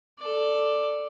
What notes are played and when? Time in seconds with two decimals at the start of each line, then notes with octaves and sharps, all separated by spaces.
0.19 A4 D5